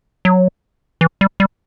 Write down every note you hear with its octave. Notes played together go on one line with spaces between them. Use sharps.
F#3
E3
G3
G3